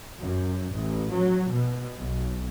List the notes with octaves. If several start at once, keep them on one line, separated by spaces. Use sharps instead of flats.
F#2
A1
F#3
B2
B1